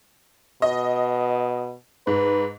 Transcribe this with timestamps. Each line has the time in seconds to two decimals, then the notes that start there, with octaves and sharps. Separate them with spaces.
0.62 B2 D#5
2.07 G#2 B4